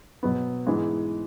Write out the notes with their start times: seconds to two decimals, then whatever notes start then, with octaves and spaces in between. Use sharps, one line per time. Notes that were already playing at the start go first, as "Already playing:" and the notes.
0.23 B2 F#3 B3
0.66 G#2 E3 G#3 B3